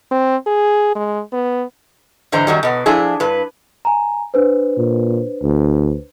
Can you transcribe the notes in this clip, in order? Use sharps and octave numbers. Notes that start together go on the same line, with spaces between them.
C4
G#4
G#3
B3
G#2 D3 E3 C5 A#5
F#2 D#3 F#3 G3
B2 B3
F3 D4 E4 G#4
G2 B4
G#5 A#5
D4 B4 C5
A#2
D2